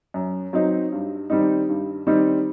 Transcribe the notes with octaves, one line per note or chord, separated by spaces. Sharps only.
F#2
F#3 C4 D#4
G2
D#3 G3 C4 D#4
G2
D#3 G3 C4 D#4